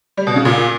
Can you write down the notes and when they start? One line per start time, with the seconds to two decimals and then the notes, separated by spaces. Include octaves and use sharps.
0.17 G3
0.27 B2
0.36 C#3
0.45 A#2